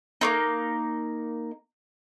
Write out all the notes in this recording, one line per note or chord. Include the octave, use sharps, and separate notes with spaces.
A#3 C4 D#4